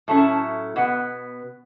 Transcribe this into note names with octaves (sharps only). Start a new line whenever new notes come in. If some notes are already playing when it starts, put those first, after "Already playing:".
A2 F#3 A3 C#4 E4 A5
B2 B3 F#5